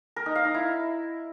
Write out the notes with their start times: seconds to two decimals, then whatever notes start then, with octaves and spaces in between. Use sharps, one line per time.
0.16 A#4
0.26 D#4
0.35 F5
0.45 D#4
0.54 E4